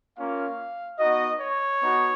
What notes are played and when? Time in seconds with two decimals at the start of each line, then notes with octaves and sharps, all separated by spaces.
0.18 A#3 C#4 F4 F5
0.99 B3 D#4 F#4 D#5
1.40 C#5
1.81 B3 D#4 F#4